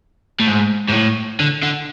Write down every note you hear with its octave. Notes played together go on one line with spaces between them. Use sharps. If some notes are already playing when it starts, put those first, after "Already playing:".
A2
G#2
G#2
A2
D3
D3